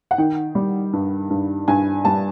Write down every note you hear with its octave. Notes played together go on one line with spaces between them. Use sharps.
F#5
D#3 G5
G3
G2
G2
G2 G#5
G3 A5